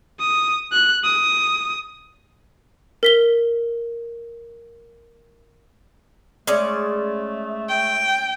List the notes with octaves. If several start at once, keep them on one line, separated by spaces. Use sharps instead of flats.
D#6
F#6
D#6
A#4 B6 G7
G#3 A3 C#4 D5
G5